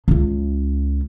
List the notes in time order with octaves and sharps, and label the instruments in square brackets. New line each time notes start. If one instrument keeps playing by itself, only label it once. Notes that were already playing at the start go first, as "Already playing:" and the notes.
[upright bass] C#2 C#3